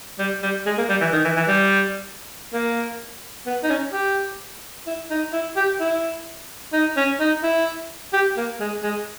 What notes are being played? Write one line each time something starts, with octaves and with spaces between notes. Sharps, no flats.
G3
G3
G#3
A#3
G3
E3
D#3
E3
E3
G3
A#3
B3
D#4
C#4
G4
E4
D#4
E4
G4
E4
D#4
C#4
D#4
E4
G4
A#3
G#3
G#3